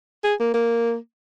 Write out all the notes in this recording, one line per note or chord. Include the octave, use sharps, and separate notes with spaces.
G#4
A#3
A#3